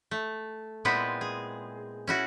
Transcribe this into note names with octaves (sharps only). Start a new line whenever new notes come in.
A3
A#2 G#3 B3 C4 E4 B4
G#4
C#4 E4 F#4